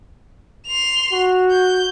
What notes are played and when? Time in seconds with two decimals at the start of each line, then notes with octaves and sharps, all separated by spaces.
0.67 C6 F7
1.13 F#4
1.51 G6